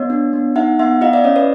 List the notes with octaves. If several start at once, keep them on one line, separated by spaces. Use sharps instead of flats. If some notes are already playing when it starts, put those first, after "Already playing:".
Already playing: B3 C#5 D#5
D4
B3
D#4 E5 F#5
B3 E5 F#5
E4 D#5 F5
D5 E5
C#4 C#5 D#5
B4 C#5